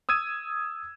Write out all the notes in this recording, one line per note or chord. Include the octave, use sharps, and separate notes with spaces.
D#6 E6 G#6 D#7